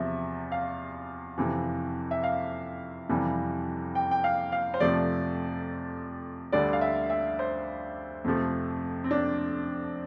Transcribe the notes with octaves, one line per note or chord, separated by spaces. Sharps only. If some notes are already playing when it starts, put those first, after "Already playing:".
Already playing: E2 C3 F3 E5
F5
F2 C3 E3
E5
F5
F2 C3 E3 G3
G5
G5
F5
F5
C5
F2 C3 F3 A3 D5
D2 D3 G3 D5
F5
E5
E5
C5
F2 C3 F3 A3
C4
D4